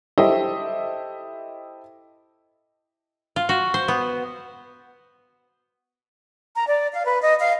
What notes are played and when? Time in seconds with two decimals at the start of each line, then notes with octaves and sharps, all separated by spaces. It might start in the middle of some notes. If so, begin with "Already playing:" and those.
0.18 E4 G4 A4 C5 D#5 E5
3.36 F4
3.49 F#4
3.74 C5
3.88 B3
6.56 A#5
6.68 D5
6.94 F5
7.06 B4
7.22 D#5
7.40 F5